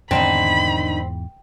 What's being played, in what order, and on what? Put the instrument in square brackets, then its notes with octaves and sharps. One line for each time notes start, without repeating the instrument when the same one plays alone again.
[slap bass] E2 G#2 [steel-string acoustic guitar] D3 D#3 D#4 [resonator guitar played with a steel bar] C4 [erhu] B5